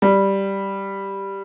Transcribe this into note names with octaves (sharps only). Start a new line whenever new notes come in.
G3